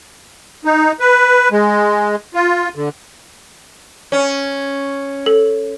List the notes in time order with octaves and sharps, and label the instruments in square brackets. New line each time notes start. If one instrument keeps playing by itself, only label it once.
[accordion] D#4
B4
G#3
F4
D3
[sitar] C#4
[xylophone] A4